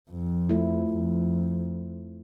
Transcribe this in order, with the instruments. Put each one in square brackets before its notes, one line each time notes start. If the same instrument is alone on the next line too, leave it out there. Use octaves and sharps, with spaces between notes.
[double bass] F2
[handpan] F3 A3 E4
[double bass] F2